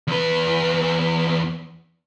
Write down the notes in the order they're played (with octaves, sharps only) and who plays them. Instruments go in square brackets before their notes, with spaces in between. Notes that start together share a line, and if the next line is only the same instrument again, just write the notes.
[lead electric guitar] E2 B4